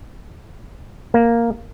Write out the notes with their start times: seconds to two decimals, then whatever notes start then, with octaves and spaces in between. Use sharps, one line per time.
1.14 A#3